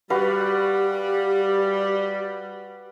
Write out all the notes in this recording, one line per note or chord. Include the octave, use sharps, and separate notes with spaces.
G3 F#4 G4 B4 F5